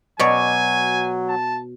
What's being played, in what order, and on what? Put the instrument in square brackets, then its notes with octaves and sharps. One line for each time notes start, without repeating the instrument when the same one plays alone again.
[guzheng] B2 C#5 D5 [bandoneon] F#3 [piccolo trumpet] G#5
[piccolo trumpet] A5